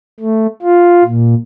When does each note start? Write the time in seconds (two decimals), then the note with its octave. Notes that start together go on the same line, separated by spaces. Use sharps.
0.20 A3
0.62 F4
1.05 A#2